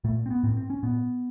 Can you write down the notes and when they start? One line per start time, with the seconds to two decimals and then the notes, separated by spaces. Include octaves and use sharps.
0.04 A#2 A3
0.26 C4
0.31 B3
0.43 A2 C4
0.57 C4
0.70 C#4
0.83 A#2 B3